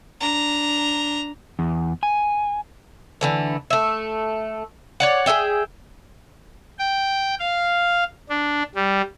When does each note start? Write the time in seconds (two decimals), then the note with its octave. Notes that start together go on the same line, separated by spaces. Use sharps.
0.20 D4 A#5
1.59 E2
2.03 G#5
3.21 D3 E3 A3
3.70 A3 E5
5.00 C#5 D5 F#5
5.26 G#4 C5 E5 G5
6.79 G5
7.40 F5
8.30 D4
8.75 G3